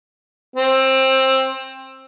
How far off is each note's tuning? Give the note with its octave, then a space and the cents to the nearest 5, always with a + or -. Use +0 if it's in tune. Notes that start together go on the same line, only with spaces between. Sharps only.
C4 +20